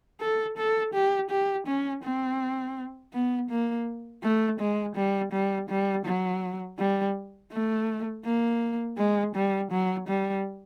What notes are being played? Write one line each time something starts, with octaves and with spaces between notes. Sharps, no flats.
A4
A4
G4
G4
C#4
C4
B3
A#3
A3
G#3
G3
G3
G3
F#3
G3
A3
A#3
G#3
G3
F#3
G3